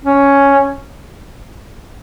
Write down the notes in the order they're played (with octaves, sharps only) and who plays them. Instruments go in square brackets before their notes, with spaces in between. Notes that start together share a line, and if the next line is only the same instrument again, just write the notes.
[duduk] C#4